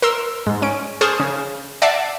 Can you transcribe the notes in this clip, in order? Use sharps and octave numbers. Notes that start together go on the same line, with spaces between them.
A#4 C6 E6
G#2
C#4 D7
G#4 C5 A5 C#6 D#6 F6
C#3
D5 E5 F#5 A5 D6 C7